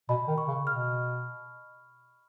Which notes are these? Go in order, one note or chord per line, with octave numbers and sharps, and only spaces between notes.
B2 B5
D#3
C#6
C#3
B2 F6